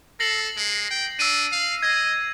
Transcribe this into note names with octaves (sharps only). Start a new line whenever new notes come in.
A4 A#6 C7 F#7
G#3
G5
D4 E6 D#7
F5
D#5 G#6